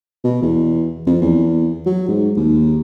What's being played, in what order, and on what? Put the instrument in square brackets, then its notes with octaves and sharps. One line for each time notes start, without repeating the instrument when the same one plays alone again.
[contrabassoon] B2
E2
F2
E2
F#3
G#2
D#2